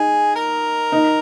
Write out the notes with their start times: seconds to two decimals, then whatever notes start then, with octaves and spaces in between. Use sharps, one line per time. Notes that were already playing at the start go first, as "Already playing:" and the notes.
Already playing: D#4 G#4
0.36 A#4
0.92 D#4